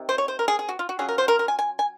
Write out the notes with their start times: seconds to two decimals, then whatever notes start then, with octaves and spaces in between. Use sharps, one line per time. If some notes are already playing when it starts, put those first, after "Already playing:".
Already playing: C3 D#3
0.09 C5
0.18 C#5
0.28 C5
0.39 A#4
0.48 G#4
0.59 G#4
0.69 F#4
0.79 F4
0.89 F#4
0.99 F#3 C#4 F4 G#4
1.09 A#4
1.18 C5
1.28 A#4
1.39 A#4
1.48 G#5
1.59 G#5
1.79 G#5